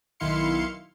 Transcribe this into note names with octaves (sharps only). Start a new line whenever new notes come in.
B1 D#3 E4 F5 C6 C#7